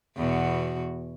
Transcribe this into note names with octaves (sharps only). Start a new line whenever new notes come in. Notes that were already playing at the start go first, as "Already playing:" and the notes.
E2 B2 F#4